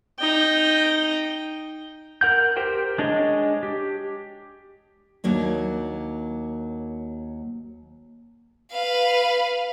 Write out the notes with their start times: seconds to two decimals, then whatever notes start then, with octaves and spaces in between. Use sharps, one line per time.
0.19 D#4 G5
2.21 A#4 F#5 G6
2.56 G4 A#4 C5 G5
2.98 G#3 D4 C#5 D#5
3.63 G4
5.24 D#2 F#3 A#3 D4
8.72 B4 F5